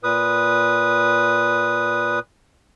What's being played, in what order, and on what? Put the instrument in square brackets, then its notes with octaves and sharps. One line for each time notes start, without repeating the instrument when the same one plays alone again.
[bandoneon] A#2 B4 D#6